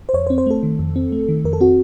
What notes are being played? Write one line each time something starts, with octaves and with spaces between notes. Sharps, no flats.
C5
F2 C#5
C5
C4
C5
A3 A4
D#3
F2
C4
A3
D#3
F2 A#4
A4
C4 F#4